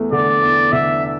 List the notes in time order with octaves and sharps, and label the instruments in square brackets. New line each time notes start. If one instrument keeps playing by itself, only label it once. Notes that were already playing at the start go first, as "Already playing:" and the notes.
Already playing: [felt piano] E2 A3
[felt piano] D3 [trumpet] D5
[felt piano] E2
[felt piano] D3 [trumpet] E5